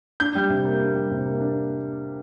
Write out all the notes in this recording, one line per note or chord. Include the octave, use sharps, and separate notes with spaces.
D4 G6
G3
C3
A#3
D4
G3
C3
A#3
D4